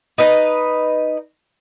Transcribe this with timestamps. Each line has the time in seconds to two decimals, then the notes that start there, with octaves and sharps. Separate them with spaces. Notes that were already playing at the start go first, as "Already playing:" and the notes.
0.18 D#4 B4 D#5